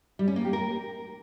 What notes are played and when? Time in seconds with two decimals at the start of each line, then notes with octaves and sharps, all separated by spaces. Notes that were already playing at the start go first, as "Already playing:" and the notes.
0.19 G3
0.28 C#4
0.36 A#3
0.45 G4
0.53 A#4